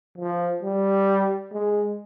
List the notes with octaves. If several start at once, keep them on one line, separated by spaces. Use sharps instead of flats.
F3
G3
G#3